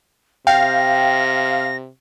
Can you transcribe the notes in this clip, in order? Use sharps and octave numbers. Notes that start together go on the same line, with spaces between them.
C3 F5 G5 A#6